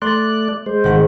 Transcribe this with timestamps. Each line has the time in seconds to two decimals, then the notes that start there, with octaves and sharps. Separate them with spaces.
0.02 A3 D5 C6 F#6 A6
0.66 G#3 C5
0.84 G#1 F#5